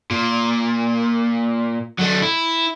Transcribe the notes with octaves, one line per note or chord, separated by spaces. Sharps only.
A#2
F#3 A3
E4